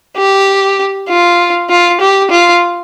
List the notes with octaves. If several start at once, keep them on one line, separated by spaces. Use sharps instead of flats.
G4
F4
F4
G4
F4